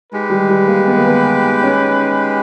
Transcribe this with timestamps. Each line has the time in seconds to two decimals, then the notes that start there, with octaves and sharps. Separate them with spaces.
0.11 G#3 D#4 G4 B4
0.30 G3
0.49 G3
0.68 A#3
0.87 B3
0.97 A#3
1.07 B3
1.64 C#4